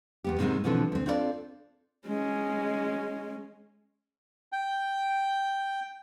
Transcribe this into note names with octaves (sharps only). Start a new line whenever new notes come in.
E2 B3 G4
G#2 C3 D#3 G#3 B3 C4
B2 D3 E3 F3 C4 A4
D2 C4
C4 D4 F4 A4 B4 D5
G#3 C#4
G5